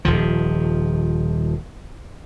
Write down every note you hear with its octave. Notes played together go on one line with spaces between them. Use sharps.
D#1 D#3 F3